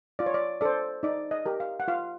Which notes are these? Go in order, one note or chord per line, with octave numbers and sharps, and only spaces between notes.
F4 D5
C#5
D5
A4 C5 D5
D#4 D5
D#5
G4 A#4
F5
F#5
F4 F5